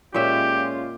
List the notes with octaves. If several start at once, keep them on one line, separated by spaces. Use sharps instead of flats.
A#2 G#3 C#4 F4 G4 C#5 E5